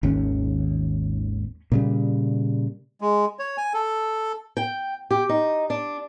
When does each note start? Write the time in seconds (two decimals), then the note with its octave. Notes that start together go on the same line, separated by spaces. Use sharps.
0.03 G#1 D#2 C#4
1.72 A#2 C#3 G3
3.01 G#3
3.39 C#5
3.58 G#5
3.74 A4
4.57 G5
5.11 G4
5.29 D#4
5.70 D4